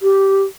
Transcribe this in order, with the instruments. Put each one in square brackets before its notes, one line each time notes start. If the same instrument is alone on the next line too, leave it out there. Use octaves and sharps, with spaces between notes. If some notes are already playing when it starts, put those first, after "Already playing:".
[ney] G4